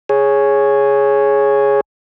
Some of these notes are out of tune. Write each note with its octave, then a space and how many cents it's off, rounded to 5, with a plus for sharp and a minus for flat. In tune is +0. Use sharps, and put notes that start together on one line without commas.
G#4 +0 C#5 +0